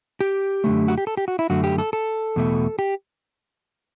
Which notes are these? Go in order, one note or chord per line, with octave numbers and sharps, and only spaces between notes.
G4
F#2 D3 A3
F#4
G4
A4
G4
F#4
E4
F#2 D3 A3 F#4
G4
A4
A4
E2 B2 A3
G4